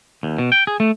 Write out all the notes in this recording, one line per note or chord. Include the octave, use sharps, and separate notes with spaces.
D#2
B2
G5
G#4
A3